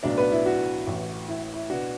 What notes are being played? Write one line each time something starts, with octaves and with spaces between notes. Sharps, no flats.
B1 A2 F#3 B3 D4 D5
B3 B4
E4
F#4
A1 A2 E3
E4
E4
B2 B3 D4 F#4